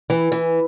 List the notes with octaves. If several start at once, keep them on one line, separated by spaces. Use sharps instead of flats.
E3
E3